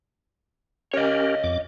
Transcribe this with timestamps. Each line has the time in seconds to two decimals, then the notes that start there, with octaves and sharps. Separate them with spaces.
0.94 C#4 G4 A#4 C#5 D#5
1.44 F2 D6